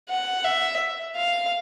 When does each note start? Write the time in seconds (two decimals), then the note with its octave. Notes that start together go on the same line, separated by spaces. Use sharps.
0.09 F#5
0.44 E5
1.16 F5